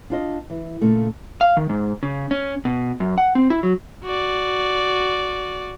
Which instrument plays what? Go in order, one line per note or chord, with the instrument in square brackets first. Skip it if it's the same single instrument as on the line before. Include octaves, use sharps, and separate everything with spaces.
[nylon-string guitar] D4 F4 D#5
E3
A#2 C#3 A3
[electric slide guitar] F5
D#3
G#2
C#3
C#4
B2
F#2
F#5
C4
E4
F#3
[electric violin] F#4 D5